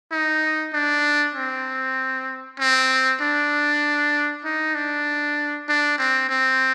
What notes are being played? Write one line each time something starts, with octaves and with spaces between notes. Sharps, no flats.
D#4
D4
C4
C4
D4
D#4
D4
D4
C4
C4